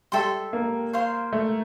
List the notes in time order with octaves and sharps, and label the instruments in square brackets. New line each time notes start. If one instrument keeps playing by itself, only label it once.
[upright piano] G3 [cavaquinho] A4 E5 G5 C6
[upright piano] A#3
[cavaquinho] C5 F5 C6
[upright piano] A3